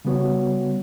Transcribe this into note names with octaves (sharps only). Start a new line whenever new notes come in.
C#3 G3 B3 F#4 C#5